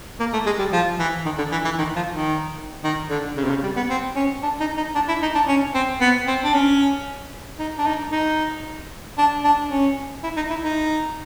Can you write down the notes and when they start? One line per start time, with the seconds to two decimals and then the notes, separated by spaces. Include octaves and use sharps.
0.20 A#3
0.33 A3
0.46 G#3
0.59 G3
0.72 F3
0.99 E3
1.26 D#3
1.38 D3
1.52 E3
1.65 E3
1.78 D#3
1.96 F3
2.14 D#3
2.84 D#3
3.10 D3
3.37 C#3
3.44 C3
3.50 C#3
3.63 G3
3.76 B3
3.89 C4
4.16 C#4
4.43 D4
4.60 D#4
4.77 D#4
4.95 D4
5.08 E4
5.22 D#4
5.35 D4
5.48 C#4
5.74 C4
6.01 B3
6.27 C4
6.44 D4
6.54 C#4
7.59 D#4
7.78 D4
7.86 D#4
8.12 D#4
9.18 D4
9.44 D4
9.71 C#4
10.24 E4
10.37 D#4
10.50 E4
10.64 D#4